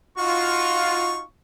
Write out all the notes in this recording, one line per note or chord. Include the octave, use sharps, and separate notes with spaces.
D#4 F4 F#4 C#6